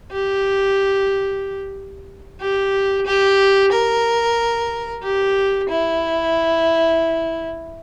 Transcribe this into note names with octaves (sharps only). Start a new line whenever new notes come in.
G4
G4
G4
A#4
G4
E4